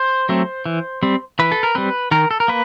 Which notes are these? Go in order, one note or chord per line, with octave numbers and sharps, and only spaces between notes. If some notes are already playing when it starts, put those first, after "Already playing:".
Already playing: C5
F#3 A3 C4
E3
G3 C4
E3 B4
A4
A#4
G3 C4 B4
D#3 A#4
A4
A#4
A#3 B4